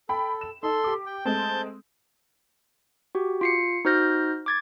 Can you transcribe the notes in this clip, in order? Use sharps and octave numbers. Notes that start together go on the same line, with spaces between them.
A4 G5 B5
E7
D#4 A4 C6
G4 D6
G5
G#3 A3 C4 A5 G6
F#4 G4
F4 C7 C#7
D#4 F#4 C5 F6 G6 A#6
D6 G#6 A6